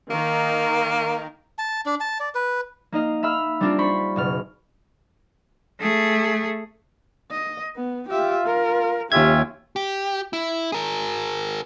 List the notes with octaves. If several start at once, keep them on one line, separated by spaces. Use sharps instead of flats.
D#3 A#3 A#4
A5
D4
A5
D5
B4
A#3 D#4 D#5 F5
E5 F5 B5 E6 F6
G3 A#3 C4 D4 F4
C5 B5 C#6 B6 C7
F#1 B2 F6
A3 G#4
D#5
B3
F4 G4 E5
A#4
D#2 C#4 F4 G4 E5 G#6
G4
E4
G#4 A#4